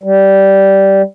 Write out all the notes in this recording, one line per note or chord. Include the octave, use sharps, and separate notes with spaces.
G3